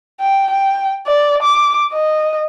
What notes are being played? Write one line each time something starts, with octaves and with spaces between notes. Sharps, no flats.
G5
G5
D5
D6
D#5